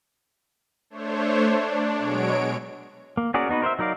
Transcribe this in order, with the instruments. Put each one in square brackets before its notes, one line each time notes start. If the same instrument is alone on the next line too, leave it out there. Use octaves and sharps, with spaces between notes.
[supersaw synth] A3 D4 C5 C#5
D4
B2 F#3 G#3 C#5 D7
[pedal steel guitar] A#3
C#4 F#4 G#4 A#4 D5
B3 D#4 F#4 B4
A#4 C5 D5 E5
F#3 D#4 A#4 D5 F5